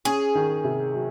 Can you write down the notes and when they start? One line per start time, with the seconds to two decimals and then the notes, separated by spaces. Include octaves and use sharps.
0.05 C#4 G#4
0.35 D#3
0.64 C3
0.94 F#3